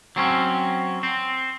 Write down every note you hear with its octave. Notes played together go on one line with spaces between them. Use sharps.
F#3 C4 C#4
C4